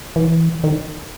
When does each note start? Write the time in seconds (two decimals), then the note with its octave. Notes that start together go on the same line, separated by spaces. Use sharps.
0.16 E3
0.64 D#3